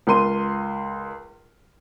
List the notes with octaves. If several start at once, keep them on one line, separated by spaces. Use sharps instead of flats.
C#2 A#4 C6 D#7